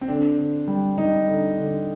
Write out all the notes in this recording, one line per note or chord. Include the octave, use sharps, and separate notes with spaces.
C4
D3 D4
D3
G3
G3 D#4
D3
D3